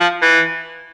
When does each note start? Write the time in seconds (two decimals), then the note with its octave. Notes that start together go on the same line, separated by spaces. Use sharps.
0.01 F3
0.22 E3